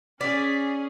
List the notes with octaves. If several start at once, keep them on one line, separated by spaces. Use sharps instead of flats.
C#4 G#4 D5 B6